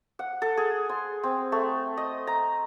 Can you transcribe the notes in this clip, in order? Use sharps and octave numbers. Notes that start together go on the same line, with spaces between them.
F#5
A4
G#4
C6
C4
A3
D#5
A#5